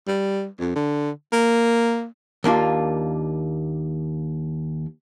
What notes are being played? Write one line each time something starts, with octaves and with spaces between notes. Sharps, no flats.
G3
F2
D3
A#3
D#2 A#3 D4 F4